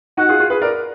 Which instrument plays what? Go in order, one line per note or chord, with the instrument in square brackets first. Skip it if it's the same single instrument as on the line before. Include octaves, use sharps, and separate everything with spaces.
[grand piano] D#4 F#4 [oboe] F#5
[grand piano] F4 G#4
F4 G#4
G#4 B4
A#4 D5